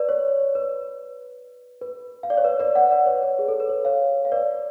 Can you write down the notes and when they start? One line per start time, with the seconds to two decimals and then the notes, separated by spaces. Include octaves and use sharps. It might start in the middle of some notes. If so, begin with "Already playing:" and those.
Already playing: B4 D5
0.09 C#5
0.55 B4
1.81 B4
2.23 F5
2.30 D5
2.37 C#5
2.44 B4
2.59 B4 D5
2.75 D5 F#5
2.91 B4 D5
3.06 C#5
3.23 B4
3.39 G#4
3.48 A4
3.60 B4
3.70 C#5
3.85 C#5 F5
4.25 F5
4.32 B4 D5